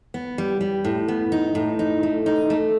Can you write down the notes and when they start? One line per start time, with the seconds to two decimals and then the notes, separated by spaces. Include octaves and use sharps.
0.14 B3
0.38 G3
0.61 G3
0.85 A2
1.08 B3
1.32 D#4
1.55 A2
1.79 D#4
2.03 A3
2.26 D#4
2.50 A3